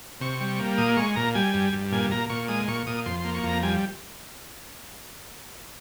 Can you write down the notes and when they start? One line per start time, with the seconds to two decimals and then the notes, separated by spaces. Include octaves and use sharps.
0.21 C3 C#6
0.40 G3
0.59 A#3
0.78 A#2 D#6
0.97 G#3 C#6
1.16 A#2 A#5
1.35 G3 G#5
1.54 G2
1.73 G2
1.92 A#2 G#5
2.11 A#2 A#5
2.30 A#2 C#6
2.48 G#3 D#6
2.68 A#2 C#6
2.87 A#2 D#6
3.06 F2 C6
3.20 A#3 C6
3.34 C#6
3.43 F2
3.49 A#5
3.63 G3 G#5